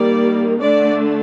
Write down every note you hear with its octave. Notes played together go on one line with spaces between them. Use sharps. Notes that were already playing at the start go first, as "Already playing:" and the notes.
Already playing: D#3 G3 A#3 D5
D3 A3 D4 D5